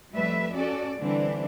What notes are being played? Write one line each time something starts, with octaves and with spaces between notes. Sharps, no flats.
F2 G3 A3 B4 E5
C#4 F#4 A4 D5
D3 E3 G3 C4 D4